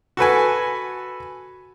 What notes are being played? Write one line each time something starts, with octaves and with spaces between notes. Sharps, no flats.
F#4 A4 B4 G#5